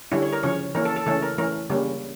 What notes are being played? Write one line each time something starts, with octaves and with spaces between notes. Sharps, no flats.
D3 G3 C#4 E4
C#5
A#4
C#3 F3 C#4 C#5
E3 A#3 C#4 A#4
A4
A4
C#3 E3 A3 C#4 A4
A#4
E3 A3 C#4 A#4
C#3 G3 A#3 C#4